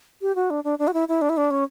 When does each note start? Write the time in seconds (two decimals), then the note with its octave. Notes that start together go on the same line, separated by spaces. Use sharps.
0.22 G4
0.36 F#4
0.50 D4
0.64 D4
0.79 D4
0.88 F#4
0.94 E4
1.08 E4
1.22 D4
1.29 E4
1.37 D4
1.51 C#4